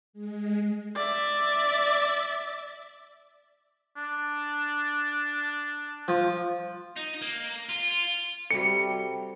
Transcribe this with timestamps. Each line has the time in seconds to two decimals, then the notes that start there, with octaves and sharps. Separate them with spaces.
0.13 G#3
0.95 D5 E5
3.97 D4
6.08 F3
6.96 D#4
7.22 A#3
7.69 F4
8.51 C3 G3 F#4 A4 C#7